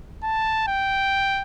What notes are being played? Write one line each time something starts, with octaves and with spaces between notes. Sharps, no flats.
A5
G5